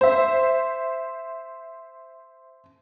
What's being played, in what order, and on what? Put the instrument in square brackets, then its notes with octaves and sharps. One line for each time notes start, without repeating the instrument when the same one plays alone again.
[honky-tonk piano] C5 E5